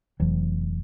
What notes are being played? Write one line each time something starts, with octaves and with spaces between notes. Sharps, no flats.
F1 E3 F#3